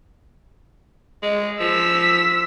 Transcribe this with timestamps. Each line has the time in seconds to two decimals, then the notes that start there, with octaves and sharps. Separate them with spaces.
1.23 G#3
1.60 F3 E6 B6